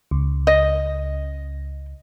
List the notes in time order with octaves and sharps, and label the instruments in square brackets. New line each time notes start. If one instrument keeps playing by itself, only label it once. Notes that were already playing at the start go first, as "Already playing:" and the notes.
[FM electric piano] C#2
[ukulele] D#5